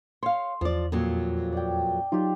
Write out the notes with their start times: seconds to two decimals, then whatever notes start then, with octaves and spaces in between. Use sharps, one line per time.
0.23 C#5 F5 C6
0.61 E2 F3 D5
0.92 F2 A#2 F#3
1.53 D5 G5
2.12 F#3 D#4 F4 G4